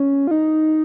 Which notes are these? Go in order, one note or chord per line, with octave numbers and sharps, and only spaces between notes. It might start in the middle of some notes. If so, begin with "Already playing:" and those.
Already playing: C#4
F4
D#4